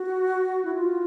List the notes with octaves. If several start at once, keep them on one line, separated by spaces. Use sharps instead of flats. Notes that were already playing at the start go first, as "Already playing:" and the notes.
Already playing: F#4
E4
F4